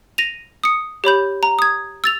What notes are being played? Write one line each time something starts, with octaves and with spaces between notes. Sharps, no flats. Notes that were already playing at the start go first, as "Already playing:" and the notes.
A#6 D#7 F7
D#6 C#7
G4 C#5 B5 G6
A#5
D#6 G#6
E6 A6 F7